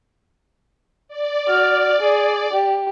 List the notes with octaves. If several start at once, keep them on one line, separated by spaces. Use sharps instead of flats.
D5
F#4 F6
G#4
G4